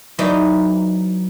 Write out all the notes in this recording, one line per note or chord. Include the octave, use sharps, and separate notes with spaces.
E3 F#3 D#4 C5 D5